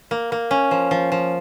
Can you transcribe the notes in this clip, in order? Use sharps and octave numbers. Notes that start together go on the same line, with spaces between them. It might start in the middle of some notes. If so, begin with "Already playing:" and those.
A#3
A#3
C#4
F3
F3
F3